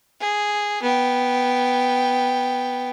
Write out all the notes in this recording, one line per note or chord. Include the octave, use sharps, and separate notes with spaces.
G#4
B3 G5